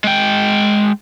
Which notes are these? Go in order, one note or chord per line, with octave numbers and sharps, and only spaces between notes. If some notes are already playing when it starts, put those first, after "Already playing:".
G#3 G5